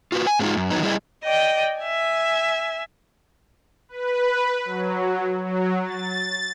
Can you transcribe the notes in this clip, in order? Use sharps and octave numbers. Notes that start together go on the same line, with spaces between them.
F4 F#4 B4
G#5
G#2 G#3 A3 C4 D#4 F4
F#2
E2 D#3 F#3 B3 D#4
G3 E4 G#4 D5 D#5
D5 D#5 G5
E5 G#5
B4
F#3
F#3
A6